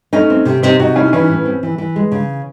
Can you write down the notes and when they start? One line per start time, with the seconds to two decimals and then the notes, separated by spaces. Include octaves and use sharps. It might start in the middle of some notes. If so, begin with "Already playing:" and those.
0.13 A3 C#4 D#4
0.30 C4
0.45 C3
0.62 C3 C4 D#4
0.80 C3 D#4 F#4
0.95 C#4 D#4 E4
1.13 E3 C#4 E4
1.28 A2
1.46 C4
1.63 E3
1.78 E3
1.96 G#3
2.12 C#3